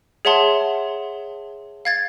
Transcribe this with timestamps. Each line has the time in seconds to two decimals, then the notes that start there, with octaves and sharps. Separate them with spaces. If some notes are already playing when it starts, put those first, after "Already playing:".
0.25 G#4 C#5 E5 F#5 A5 C6
1.85 F5 G#6 A6